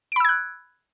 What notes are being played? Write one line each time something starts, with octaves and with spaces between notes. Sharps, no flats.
B5 E6 F#6 G#6 D7